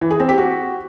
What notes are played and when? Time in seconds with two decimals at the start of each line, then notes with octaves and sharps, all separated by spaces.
0.01 E3
0.10 G#4
0.20 C4
0.29 G4
0.38 F#4